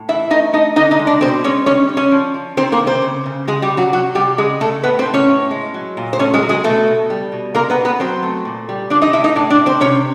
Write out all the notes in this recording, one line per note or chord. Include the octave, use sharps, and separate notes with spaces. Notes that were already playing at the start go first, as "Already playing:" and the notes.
Already playing: A2
E3 E4 E5
A3 D#4 D#5
A3 D#4 D#5
D3 D#4 D#5
D#4 D#5
G#3
D4 D5
B2 C4 C5
G#3 C#4 C#5
G3 C#4 C#5
G3
C#4 C#5
F3
F3
D#3 C4 C5
A#3 A#4
C3
C4 C5
C#3
C#3
C#3 G#3 G#4
G3 G4
C#3
F#3 F#4
C3 F#3 F#4
C3 G3 G4
C#3 G#3 G#4
C#3 A3 A4
A2 B3 B4
C4 C5
A2
C#4 C#5
A2
G#3
F#3
A#2
C5
A3 C#4 C#5
G#3 G#4
F#3
G#3 G#4
B2 A3 A4
B2
G3
B2
G#3 A#3 A#4
B3 B4
B2
B3 B4
F#3 C4 C5
A3
A#2
G3
F3 D4 D5
D#4 D#5
A2 E4 E5
D#4 D#5
A2 D4 D5
D4 D5
A2
C4 C5
C3 C#4 C#5